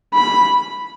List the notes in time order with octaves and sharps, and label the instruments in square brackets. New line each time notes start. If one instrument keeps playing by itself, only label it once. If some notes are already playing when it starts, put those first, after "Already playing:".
[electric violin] B5